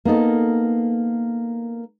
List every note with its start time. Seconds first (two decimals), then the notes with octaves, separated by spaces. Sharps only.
0.05 A#3 B3 D#4 A4